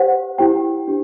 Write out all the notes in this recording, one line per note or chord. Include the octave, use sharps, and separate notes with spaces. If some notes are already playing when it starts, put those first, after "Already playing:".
Already playing: G4 C5 F#5
E4 G4 C5 G5
D4 G4